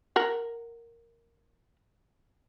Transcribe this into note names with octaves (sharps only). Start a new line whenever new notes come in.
A#4 F#5